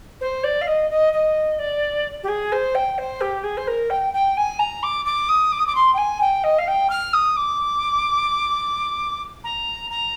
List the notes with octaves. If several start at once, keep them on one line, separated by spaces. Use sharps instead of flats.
C5
D5
F5
D#5
D#5
D#5
D5
G4
G#4
C5
G5
C5
G4
G#4
C5
A#4
G5
G5
G#5
A#5
D6
D6
D#6
D6
D#6
D6
C6
G5
G#5
G5
D#5
F5
G5
F6
D#6
D6
A#5
A#5